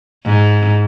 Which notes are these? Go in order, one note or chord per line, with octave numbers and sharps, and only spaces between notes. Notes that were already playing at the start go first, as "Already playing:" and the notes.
G#2